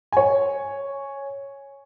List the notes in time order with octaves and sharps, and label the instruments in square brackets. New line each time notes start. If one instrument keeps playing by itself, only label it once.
[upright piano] C#5 G#5